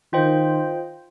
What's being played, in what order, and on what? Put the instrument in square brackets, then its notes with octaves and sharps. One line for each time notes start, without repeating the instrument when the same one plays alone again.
[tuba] D#3 [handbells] F4 C5 D#5 G5